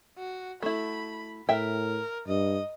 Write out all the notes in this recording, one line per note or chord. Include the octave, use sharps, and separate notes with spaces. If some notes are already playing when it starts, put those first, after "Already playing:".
F#4
A3 E4 B5
A2 A#4 E5 G5
G2 D#5